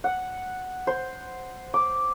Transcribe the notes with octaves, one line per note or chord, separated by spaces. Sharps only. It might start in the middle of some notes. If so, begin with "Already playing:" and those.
F#5
C5
D6